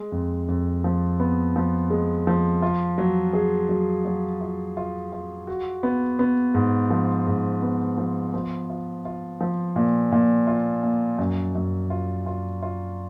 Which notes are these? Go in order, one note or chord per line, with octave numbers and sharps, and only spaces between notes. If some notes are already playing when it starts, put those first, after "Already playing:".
Already playing: G#3
F2
F2
F3
B3
F3
G#3
F3
F4
F#3
G#4
F#3
F#3
F4
F4
F4
F#4
B3
B3
G#2
F3
G#2
B3
F3
F3
F4
F4
F3
A#2
A#2
F4
A#3
F#2
F#2
F4
F4
F4